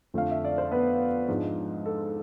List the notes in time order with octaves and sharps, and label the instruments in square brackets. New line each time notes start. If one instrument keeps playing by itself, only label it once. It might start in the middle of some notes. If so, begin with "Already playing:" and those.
[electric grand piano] F2 D3 F3 A3 [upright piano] F5
[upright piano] E5
D5
C5
B3 B4
[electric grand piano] G#2 F3 G#3 D4
[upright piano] A4